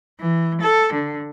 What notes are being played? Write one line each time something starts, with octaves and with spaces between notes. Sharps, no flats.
E3
A4
D3